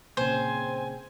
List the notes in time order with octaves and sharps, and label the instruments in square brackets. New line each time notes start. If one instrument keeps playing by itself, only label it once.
[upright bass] A#2 C#3 [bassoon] C4 [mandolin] C5 [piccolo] G#5